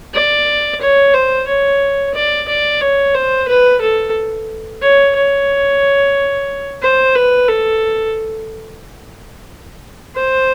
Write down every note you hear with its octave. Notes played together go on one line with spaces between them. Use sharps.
D5
C#5
C5
C#5
D5
D5
C#5
C5
B4
A4
C#5
C#5
C5
B4
A4
C5